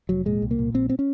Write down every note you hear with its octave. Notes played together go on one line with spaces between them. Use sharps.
F1 F#3
A#2 G#3
C2
A#3
A#2
A#1 C4
C4
C#4